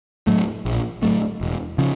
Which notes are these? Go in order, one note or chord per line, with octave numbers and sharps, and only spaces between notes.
A2 F#3 A3
A#1
A2 F#3 A3
E1
C#3 F3